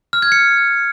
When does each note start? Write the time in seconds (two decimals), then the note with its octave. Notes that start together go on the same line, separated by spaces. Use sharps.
0.13 F6
0.22 G#6
0.32 C#7